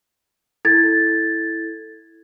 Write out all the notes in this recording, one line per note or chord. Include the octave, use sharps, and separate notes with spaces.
E4 A4 G#6 A6